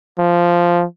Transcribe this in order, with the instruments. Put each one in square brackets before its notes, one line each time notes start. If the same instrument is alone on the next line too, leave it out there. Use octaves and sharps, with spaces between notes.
[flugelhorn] F3